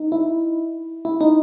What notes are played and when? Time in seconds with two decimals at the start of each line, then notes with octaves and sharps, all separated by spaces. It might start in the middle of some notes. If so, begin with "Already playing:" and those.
Already playing: D#4
0.12 E4
1.05 E4
1.21 D#4